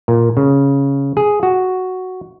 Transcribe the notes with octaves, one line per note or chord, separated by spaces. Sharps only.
A#2
C#3
G#4
F#4